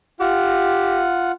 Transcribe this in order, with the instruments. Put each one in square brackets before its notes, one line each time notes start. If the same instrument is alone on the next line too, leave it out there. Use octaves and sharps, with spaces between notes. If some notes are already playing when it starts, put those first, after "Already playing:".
[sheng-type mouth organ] F4 F#5 [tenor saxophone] G4